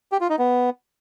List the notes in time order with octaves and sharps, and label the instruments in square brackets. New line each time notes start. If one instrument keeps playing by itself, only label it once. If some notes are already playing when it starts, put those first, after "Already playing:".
[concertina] G4
F4
D#4
B3